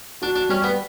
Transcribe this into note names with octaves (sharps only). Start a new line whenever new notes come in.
D4 F#4
D4
G3 C#4
B3